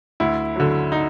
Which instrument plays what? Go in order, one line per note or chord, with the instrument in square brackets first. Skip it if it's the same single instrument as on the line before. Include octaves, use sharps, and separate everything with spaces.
[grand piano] D2 E4
D3 F#3
D#4